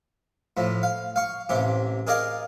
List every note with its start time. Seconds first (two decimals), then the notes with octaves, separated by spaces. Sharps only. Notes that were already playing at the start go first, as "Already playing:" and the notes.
0.57 A2 F3
0.83 F5
1.16 F5 C#6
1.49 A1 C3 G4
2.07 G#4 A#4 D5 D#5 F5